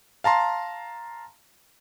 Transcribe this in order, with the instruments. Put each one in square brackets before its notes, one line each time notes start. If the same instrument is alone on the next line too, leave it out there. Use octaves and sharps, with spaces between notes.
[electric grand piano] F5 A5 A#5 C6